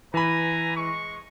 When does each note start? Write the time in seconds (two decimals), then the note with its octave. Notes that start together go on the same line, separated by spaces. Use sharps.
0.14 E3 B4 G#5 A#5 B5
0.77 G#3 C#6